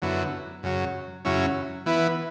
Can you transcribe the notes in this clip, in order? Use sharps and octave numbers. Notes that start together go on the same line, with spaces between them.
F#2 D3 F#3 B3 E4
F#2 C#3 F#3
F#2 C#3 F#3 C#4 E4
E3 B3 E4 B4